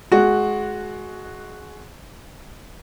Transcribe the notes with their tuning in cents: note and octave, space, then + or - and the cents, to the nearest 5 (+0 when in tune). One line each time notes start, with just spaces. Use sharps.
G#3 +20 F#4 +0